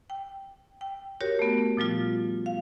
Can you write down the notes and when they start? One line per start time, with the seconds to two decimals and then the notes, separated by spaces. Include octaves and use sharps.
0.10 G5
0.81 G5
1.21 F#4 G4 A#4 C#5
1.39 A3 B3
1.77 A#2 F3 G3 F4
2.46 F5